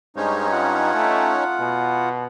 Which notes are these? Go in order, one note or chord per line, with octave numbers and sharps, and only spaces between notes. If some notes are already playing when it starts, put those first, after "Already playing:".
G2 G#3 C#4 D#4 C5 C#5
F4 F#5
A3
B2